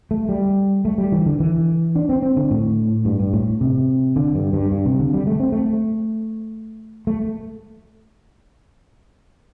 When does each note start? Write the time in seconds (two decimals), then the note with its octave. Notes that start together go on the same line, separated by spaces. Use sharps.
0.11 A3
0.29 G3
0.85 A3
0.98 G3
1.12 E3
1.26 D3
1.40 E3
1.95 D4
2.09 C4
2.22 C4
2.37 D3
2.51 A2
3.05 G2
3.20 G2
3.33 A2
3.61 C3
4.16 D3
4.35 G2
4.53 G2
4.72 G2
4.86 C3
4.99 D3
5.14 G3
5.27 A3
5.40 C4
5.52 A3
7.07 A3